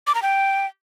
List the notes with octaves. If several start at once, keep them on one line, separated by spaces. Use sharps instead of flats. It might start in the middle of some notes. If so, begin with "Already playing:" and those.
D6
A#5
G5